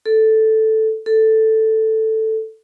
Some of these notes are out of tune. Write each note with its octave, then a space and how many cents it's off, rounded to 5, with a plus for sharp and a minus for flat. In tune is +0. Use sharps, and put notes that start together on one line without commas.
A4 +0
A4 +5